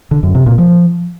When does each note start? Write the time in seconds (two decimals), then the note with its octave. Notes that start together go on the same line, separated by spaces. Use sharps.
0.11 D3
0.23 F#2
0.35 C3
0.46 A#2
0.58 F3